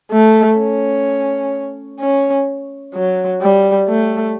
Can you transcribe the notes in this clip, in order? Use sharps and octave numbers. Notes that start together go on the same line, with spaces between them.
A3
C#4
C#4
F#3
G3
A3